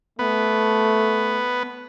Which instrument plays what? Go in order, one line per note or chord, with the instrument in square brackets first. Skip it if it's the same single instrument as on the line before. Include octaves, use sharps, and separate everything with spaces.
[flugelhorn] A3 [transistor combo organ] B3